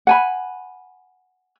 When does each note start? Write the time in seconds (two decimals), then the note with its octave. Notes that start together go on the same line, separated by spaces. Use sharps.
0.07 F#5 G#5 B5